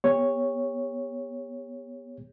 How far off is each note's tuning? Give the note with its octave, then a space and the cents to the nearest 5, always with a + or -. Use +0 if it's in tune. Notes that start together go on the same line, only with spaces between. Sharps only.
B3 -15 G4 +45 C#5 +0